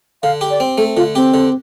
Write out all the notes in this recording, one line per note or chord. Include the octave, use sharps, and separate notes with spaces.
D3 F5
G4
D5
C4
A3 A4
D3 F4
C4 G4
D3